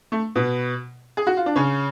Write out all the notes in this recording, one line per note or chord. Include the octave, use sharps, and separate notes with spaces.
A3
B2 B3
G#4
F#4
F4
D4
C#3 C#4